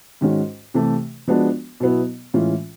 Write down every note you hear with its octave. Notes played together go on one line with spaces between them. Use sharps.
G#2 D#3 G#3 C#4 F#4
C3 E3 A3
F3 G#3 B3 D4 F#4
B2 F#3 B3 E4
A2 E3 G#3 C#4 F4